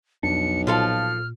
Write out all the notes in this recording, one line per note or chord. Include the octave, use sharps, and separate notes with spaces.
B1 F2 D4 C#7
A#2 F3 A4 F5 F6